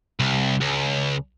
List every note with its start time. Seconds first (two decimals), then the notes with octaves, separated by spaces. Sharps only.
0.20 C2
0.61 C#2